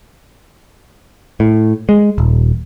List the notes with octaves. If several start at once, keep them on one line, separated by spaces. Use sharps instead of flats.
A2
G#3
D#1